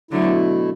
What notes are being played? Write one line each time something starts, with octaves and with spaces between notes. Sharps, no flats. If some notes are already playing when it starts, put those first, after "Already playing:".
B2 D3 F#3 A3 E4